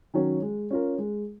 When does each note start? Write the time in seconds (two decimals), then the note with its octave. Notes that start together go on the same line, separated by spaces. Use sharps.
0.14 D#3 F#3 C#4 F#4
0.42 G#3
0.71 C#4 F4 A#4
0.98 G#3